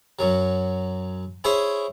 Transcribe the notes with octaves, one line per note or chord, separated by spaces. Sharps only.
F#2 F#3
E4 G#4 C5 C#5